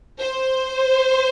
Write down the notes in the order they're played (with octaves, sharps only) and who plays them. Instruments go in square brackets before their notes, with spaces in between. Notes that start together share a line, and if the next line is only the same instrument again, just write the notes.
[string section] C5